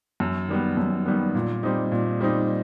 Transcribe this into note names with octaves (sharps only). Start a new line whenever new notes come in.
F#2
D#3 G3 B3
F#2
D#3 G3 B3
A#2
G3 C4 D#4
A#2
G3 C4 D#4